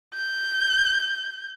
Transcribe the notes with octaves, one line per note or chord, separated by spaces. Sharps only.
G6